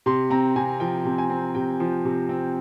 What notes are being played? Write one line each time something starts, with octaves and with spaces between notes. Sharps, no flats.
C3 C6
C4 A#5
C3 G#5
F3 G5
C3
G#5
C4
C3 G5
F3
C3
C4